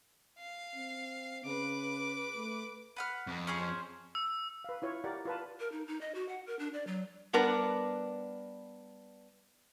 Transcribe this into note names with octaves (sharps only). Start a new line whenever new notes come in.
F5
C4
C#3 B4 D6
A3
B4 F#5 F6
F2
C#4 G#4 C5
E6
B4 F5
E4 F4 C#5
G4 A#4 D5 F#5
F4 B4 A5
A#4
D#4
D#4
D#5
F#4
F#5
A#4
D4
D5
F#3
G3 B3 D4 A#4 B4